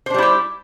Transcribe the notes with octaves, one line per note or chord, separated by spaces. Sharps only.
G3 D4 E4 G4 C5